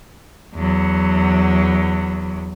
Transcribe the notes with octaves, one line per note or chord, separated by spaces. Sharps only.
E2 F#3